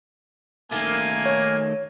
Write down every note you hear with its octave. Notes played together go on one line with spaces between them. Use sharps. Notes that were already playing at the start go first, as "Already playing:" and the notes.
D#3 A3 A#3 G#5
C#5